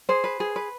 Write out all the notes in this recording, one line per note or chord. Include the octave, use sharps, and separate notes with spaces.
G#4 C5
B4
G#4
B4